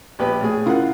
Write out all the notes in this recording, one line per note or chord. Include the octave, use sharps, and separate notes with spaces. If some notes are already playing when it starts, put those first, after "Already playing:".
A#1 G4 B4
A2 G#4
C#3 E4 F4 A#4 F#5